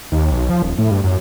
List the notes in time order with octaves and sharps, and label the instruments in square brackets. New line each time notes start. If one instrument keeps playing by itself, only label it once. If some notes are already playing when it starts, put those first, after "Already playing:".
[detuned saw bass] D#2
B1
F3
D#1
A2
G2
F#2